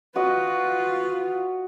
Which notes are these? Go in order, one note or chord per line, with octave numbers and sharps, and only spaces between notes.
F4 F#4 B4 D#5